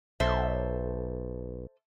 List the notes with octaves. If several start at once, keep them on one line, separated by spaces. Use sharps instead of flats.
B1 A4 C5 E5